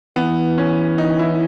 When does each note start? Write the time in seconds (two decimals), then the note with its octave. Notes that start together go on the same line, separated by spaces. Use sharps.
0.16 E3 B3
0.58 C#4
0.98 D#4
1.19 E4